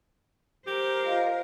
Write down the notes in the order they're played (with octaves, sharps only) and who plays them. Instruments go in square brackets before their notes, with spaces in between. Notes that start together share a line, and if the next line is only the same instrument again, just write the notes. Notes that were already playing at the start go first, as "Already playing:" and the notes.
[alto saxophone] G4 [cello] A#4 C5
[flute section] F4 D#5 F5